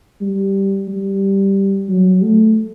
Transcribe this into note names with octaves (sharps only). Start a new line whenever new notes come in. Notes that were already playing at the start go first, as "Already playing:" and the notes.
G3
G3
F#3
A3